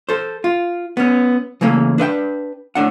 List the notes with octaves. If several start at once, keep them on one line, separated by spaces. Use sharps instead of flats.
A4 C5
F4
B3 C#4
C#3 E3 A3 A#3 C#4
D4 B4 E5 G5
A2 D4 F#5